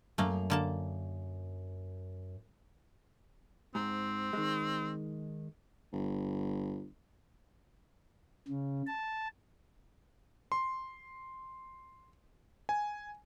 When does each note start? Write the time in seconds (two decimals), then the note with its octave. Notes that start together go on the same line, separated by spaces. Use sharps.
0.18 F#2 A3 A#3
0.50 D3 A#3 A5
3.75 G#2 C4
4.33 D#3 G#3
5.93 G1
8.48 C#3
8.87 A5
10.52 C6
12.69 G#5